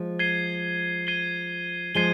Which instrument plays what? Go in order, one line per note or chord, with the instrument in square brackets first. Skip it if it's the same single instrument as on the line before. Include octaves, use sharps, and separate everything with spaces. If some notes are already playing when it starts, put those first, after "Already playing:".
Already playing: [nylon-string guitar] F3 G#3
[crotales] G#6 C7 D#7 G7
G#6 C7 D#7 G7
[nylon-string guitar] F3 G#3 [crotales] G#6 C7 D#7 G7